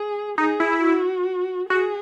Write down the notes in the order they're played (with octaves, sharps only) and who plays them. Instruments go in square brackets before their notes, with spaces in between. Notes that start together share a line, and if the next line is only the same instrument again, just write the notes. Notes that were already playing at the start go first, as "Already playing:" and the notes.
Already playing: [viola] G#4
[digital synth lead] D#4 [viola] G#4
[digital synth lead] E4
[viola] F#4
[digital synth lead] F#4 [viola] G#4